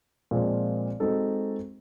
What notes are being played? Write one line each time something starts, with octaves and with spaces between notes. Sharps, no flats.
A#2 F3 G#3 C4
G#3 C4 D#4 F#4 A4